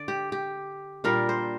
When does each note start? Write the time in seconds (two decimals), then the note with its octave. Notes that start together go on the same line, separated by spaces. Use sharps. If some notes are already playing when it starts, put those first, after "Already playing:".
Already playing: D3 D4 D5
0.08 G4
0.32 G4
1.04 A#2 G3 D4 A#4
1.29 C5